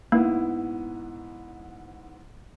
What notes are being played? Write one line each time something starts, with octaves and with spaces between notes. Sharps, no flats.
G#2 A#3 B3 E4